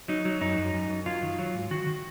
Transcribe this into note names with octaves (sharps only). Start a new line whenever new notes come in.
F#3 D#4
F#3
F#2 D#4
F#2
F#2
F#2
F#3 F4
D#3
F#3
G#2
D#3 F#4
D#3